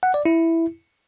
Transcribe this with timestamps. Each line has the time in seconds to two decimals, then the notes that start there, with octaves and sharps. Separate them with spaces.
0.03 F#5
0.14 D5
0.25 E4